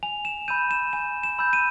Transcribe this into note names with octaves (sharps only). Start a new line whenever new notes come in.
G#5 F7
E7
B5 E6 G6 D#7
E7
G#5 E7
E7
B5 E6 G6
D#7